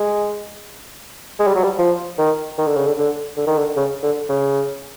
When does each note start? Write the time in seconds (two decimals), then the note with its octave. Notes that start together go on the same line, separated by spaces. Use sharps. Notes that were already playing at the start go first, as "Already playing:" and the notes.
Already playing: G#3
1.39 G#3
1.47 G3
1.55 F#3
1.63 G3
1.78 F3
2.18 D#3
2.58 D#3
2.67 D3
2.76 C#3
2.86 D3
2.97 D3
3.37 D3
3.47 D#3
3.58 D3
3.77 C#3
4.03 D3
4.29 C#3